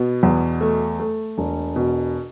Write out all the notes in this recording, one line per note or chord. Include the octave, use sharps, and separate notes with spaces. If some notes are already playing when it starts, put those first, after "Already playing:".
Already playing: B2 B3
E2
A3
A3
E1
B2